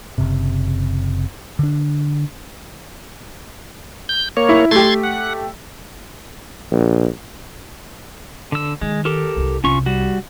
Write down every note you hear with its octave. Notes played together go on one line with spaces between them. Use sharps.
F#1 C3
D3 D4
G6
A#3 C#5
E4
A3 G4 C6 G#6 A6
F#5
A#1
D3 E6
D#3 G#3
G4 A4 A#4
C2 E4
C2 C#4 F4 C#6
G3 F#4